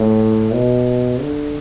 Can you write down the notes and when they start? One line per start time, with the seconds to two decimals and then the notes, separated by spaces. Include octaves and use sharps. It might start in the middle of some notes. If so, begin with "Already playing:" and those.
Already playing: A2
0.54 B2
1.21 D3